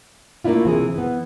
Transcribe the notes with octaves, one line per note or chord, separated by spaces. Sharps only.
A3 A#3 C4 D4 E4 F4
C3 E3 G#4
E3 B3